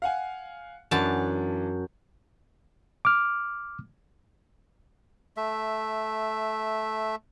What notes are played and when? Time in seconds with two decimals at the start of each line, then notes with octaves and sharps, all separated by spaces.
0.02 F5 F#5 G#5
0.91 F#2 E3 D4 F#5 A5
3.05 D6 F6
5.37 A3 E5